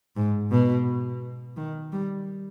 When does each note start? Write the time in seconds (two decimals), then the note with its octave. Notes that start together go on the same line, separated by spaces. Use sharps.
0.16 G#2
0.52 B2
1.57 D#3
1.92 G3